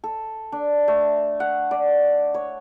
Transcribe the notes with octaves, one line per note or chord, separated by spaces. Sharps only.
A4
D4
A3
F#5
D5
C#5